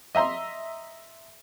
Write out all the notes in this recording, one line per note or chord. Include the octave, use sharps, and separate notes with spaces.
D#5 E5 A#5 C6